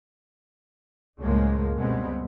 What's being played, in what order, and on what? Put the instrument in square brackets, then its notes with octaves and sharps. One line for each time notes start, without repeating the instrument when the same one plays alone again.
[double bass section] C#2 F#2 A2 F3 G#3 A#3
C#2 B2 G3 G#3 B3 C4